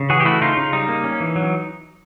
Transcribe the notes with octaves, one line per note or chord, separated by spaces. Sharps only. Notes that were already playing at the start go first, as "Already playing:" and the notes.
Already playing: C#3
E3 F#4 G#4
G4
A3 E4 F#4
C#3 D#4 F4
C#3
G3 D#4
A#3
C#4
E3
F#3